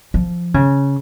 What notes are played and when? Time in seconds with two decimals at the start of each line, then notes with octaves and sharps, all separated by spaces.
0.14 F3
0.54 C#3